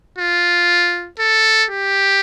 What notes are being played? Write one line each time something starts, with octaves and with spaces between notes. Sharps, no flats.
F4
A4
G4